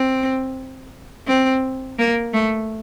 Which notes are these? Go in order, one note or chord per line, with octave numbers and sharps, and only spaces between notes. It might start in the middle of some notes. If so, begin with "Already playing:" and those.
Already playing: C4
C4
A#3
A3